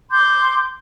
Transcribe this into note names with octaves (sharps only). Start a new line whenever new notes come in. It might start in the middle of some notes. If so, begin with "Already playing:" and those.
C6 D6 G6